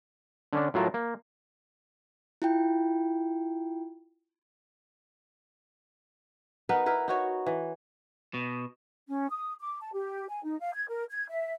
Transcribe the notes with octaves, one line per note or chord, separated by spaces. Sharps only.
D3 C#4 D4
A2 F#3 F4 A#4 A5
A#3
E4 F4 G5
B3 D#4 A#4 B4
E4 A#4 B4
D#4 F#4 C#5
E3
B2
C#4
D#6
D6
A5
G4
G#5
D#4
F5
G#6
A#4
G#6
E5